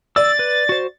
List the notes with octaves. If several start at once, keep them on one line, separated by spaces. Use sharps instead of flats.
D5 E6 A6
B4
F#4 C5